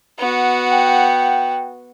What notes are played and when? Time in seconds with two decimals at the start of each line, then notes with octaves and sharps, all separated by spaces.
0.18 B3 F#4
0.73 G5